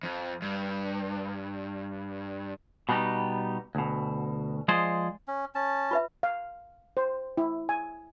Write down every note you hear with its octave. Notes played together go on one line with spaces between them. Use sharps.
F2
G2
B2 G3 B3 C#4 D#4 G4
D2 B2
F3 G#3 G#4 C5 D5 D#5
C#4
C#4 A5
F4 B4 E5
F5
C5
E4
G#5